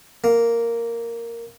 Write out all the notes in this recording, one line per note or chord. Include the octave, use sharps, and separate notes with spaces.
A#3